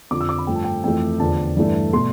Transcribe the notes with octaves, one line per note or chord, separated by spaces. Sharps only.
F2 D3 F3 D6
E6
D6
B5
G2 F3 A3 G5
A5
G5
F2 E3 A3 G5
E2 D3 F3 A5
G2 E3 A3
B2 A3 C6